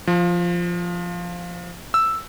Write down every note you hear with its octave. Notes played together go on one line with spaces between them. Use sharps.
F3
E6